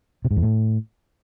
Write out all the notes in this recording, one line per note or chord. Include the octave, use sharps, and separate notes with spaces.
C3
G#2
E2
A2